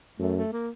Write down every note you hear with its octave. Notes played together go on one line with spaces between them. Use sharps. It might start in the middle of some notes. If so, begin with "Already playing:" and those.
F#2 A3
A3
A#3